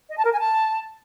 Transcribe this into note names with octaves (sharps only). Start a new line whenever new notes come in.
D#5
A5
A#4
G#5
A5